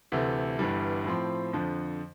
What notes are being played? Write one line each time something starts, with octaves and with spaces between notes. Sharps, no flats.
D2 C3 E3 A3
G1 G2 E3 G3
A2 F3 C4
F2 D3 F3